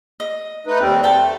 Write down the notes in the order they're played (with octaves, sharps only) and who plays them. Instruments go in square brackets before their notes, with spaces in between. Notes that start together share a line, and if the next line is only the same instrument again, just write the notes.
[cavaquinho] D#5
[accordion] A3 D#4 B4
D#2 G3 C4
[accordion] A3 [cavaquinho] C5 G5 A5